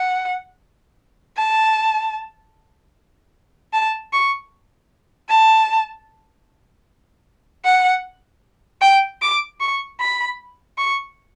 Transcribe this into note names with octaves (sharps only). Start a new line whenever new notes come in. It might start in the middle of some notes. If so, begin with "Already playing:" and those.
Already playing: F#5
A5
A5
C#6
A5
F#5
G5
D6
C#6
B5
C#6